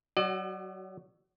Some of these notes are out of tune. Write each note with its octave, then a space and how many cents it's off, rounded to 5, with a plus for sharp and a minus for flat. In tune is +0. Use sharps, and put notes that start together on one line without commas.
F#3 +30 F#4 +0 D5 +45